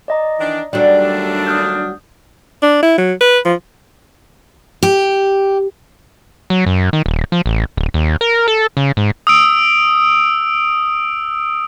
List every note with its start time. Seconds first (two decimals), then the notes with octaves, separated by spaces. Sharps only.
0.08 D5 D#5 A#5
0.38 D#3 E3 D4
0.73 D#2 F#3 G3 A3 D4 D5
1.47 D#6 F6 G6
2.63 D4
2.83 E4
2.98 F#3
3.21 B4
3.45 F3
4.83 G4
6.50 F#3
6.66 F#2
6.93 D#3
7.06 D#1
7.32 F3
7.46 A1
7.77 D1
7.94 D#2
8.21 A#4
8.48 A4
8.77 C#3
8.97 G#2
9.27 D#6 E6 D7